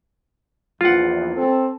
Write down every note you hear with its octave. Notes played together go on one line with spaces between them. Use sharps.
A#1 E2 F4 F#5
C4 A4